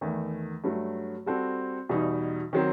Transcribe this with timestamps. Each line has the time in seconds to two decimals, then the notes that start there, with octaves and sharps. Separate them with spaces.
0.01 E2 D#3 A3
0.64 G2 F#3 A3
1.26 G3 C4 F#4 A4
1.89 E2 B2 G3 D#4
2.53 D#3 F#3 C4